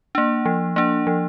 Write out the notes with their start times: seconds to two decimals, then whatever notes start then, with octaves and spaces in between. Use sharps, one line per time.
0.15 A#3 D4
0.45 F3
0.76 A#3 D4
1.07 F3